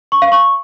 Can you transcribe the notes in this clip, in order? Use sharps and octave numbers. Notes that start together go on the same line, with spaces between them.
C#6
F5
C#6